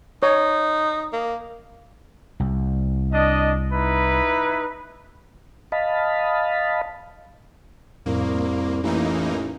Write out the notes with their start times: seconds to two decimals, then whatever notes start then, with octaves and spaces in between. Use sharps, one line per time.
0.23 D#4 C#5
1.13 A#3
2.40 C2
3.13 D4 D#5
3.72 D#4 E4 B4
5.72 D#5 F5 A5 B5
8.06 C2 F2 A2 A#3
8.83 A1 E3 A#3 D#4